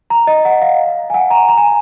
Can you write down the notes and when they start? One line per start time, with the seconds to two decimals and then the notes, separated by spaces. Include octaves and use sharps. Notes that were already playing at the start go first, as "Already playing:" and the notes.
0.10 A#5
0.27 D#5
0.45 F#5
0.62 F5
1.10 G#5
1.14 F#5
1.31 A#5
1.48 A#5
1.57 G#5